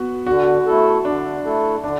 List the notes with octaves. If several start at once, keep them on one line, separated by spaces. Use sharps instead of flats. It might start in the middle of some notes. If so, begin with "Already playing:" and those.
Already playing: B3 F#4
D3 F#4
A3 E4 A4
D3 D4
A3 E4 A4
D3 D4